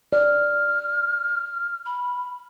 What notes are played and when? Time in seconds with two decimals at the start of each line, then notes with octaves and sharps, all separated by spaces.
0.13 D5 F6
1.86 B5